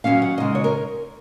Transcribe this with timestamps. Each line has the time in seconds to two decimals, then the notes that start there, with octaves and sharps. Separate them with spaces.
0.04 D#2 C#3 F#3 C#4 F5
0.22 F#5
0.38 C#3 G#3 D#4 D#5
0.55 C#5
0.64 A#4